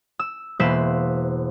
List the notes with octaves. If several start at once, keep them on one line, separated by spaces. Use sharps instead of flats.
E6
E1 A#3 B4 C5 E5 E6